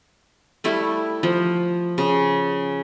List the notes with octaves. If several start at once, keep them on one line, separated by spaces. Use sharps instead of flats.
G3 A3 E4
F3
C#3